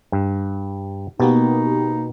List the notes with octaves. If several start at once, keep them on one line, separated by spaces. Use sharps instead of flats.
G2
B2 A#3 B3 D#4 G4